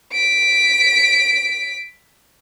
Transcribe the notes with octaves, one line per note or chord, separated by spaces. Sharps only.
B6 D7